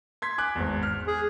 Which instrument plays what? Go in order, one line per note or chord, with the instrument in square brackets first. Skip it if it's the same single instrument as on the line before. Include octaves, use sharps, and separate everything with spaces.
[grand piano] C6 G#6 B6
G#5 D6 F#6
G#1 E2
F6
[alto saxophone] G#4